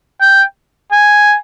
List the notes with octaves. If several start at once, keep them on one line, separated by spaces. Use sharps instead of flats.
G5
G#5